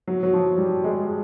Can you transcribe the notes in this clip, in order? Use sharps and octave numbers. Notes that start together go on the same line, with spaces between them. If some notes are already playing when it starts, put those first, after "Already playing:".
F#3
F#3
F3
G3
G#3